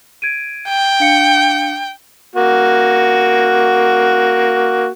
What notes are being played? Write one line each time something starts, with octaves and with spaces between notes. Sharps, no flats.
G#6 D7 D#7
G5
D4 F5 C#7
A#3 F#4